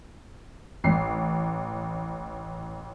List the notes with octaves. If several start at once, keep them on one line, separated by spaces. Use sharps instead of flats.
A1 C7